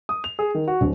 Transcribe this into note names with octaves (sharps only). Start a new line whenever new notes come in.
D#6
F7
G#4
D#3
F#4
D1